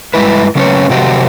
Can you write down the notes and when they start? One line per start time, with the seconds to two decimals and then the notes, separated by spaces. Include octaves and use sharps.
0.14 G2 C#3 G#3 E4 B4
0.55 C#3 F#3 C#4 G#4 B4 C#5
0.90 C3 F3 F#3 C4 F#4 G4